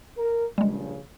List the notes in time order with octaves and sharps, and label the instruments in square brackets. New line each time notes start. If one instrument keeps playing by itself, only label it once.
[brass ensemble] A#4
[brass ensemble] A#1 G2 C#3 [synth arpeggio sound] G3 G#3